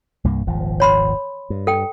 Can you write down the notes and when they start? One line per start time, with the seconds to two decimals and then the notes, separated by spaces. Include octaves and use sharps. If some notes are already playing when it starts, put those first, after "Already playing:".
0.24 C2 G2 A#3
0.47 D#1 G#1 F3
0.80 C#5 B5 C6
1.50 G2
1.67 A4 G5